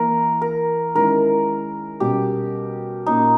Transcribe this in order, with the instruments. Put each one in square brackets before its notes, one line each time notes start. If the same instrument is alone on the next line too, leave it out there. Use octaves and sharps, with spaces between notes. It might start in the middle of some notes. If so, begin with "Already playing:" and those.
Already playing: [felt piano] E3 A#3 E4 [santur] A#4
[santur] A#4
[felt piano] D#3 G#3 C#4 E4 [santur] A#4
[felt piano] B2 G3 C#4 [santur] G4
[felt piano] A#2 A#3 C#4 [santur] D#4